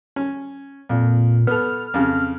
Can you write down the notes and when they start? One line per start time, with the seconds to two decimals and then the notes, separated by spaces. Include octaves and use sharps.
0.16 C#4
0.89 F2 A#2
1.47 B3 A4 F6
1.94 F2 C#3